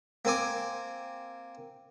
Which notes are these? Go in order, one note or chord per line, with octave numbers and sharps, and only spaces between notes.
A#3 C4 G#5 D6